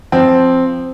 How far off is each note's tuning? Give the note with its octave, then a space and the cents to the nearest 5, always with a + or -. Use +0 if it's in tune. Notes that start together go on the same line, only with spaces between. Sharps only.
F3 +0 C4 +0